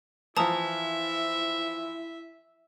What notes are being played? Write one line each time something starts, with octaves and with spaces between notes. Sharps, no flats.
E3 F3 E4 E5 A5 A#5 D#6